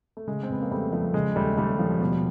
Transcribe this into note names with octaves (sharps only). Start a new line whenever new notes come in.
A3
C#3 G#3
C4
F2 B3
A#3
F2 G3 A3
F3 G3 A3
C#3 G#3
D#2 G3 A3
D#2 G3 A3
F3
B2 G3